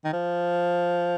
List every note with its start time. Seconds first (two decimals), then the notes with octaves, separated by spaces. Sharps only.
0.05 D#3
0.13 F3